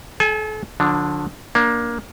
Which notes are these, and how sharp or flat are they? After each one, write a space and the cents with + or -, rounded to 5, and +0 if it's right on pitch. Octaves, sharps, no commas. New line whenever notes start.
A4 -40 G#5 +0
D3 +0 F3 +40 D4 +0
A#3 +15 D4 +0